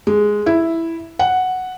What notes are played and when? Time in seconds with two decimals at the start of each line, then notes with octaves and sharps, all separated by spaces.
0.07 G#3
0.46 E4
1.19 F#5